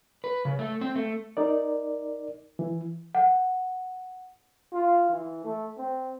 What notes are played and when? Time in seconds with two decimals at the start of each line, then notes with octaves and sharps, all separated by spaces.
0.24 B4
0.45 C#3
0.59 A3
0.81 C4
0.96 A3
1.37 D#4 A#4 D5
2.59 E3
3.15 F#5
4.72 F4
5.10 E3
5.44 A3
5.77 C4